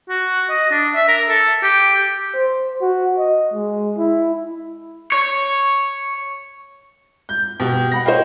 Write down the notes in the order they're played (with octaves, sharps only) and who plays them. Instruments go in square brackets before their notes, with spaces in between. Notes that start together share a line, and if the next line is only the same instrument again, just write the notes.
[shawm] F#4
D#5
D4
E5
A#4
A4
G4
[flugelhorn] C5
F#4
D#5
G#3
E4
[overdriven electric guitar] C#5
[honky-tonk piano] G6
B2 G4
F#5 B5 A#6
C5 C#5 D#5 F5 G5